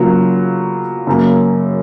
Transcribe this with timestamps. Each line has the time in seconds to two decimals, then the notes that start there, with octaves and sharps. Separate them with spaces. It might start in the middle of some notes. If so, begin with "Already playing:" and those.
Already playing: C#3 F#3 A#3 F4
1.07 F#2 C#3 F#3 A#3